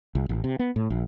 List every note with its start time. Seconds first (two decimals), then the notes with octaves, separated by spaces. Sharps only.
0.15 C2
0.29 A1
0.44 C3
0.59 B3
0.76 A2
0.90 A#1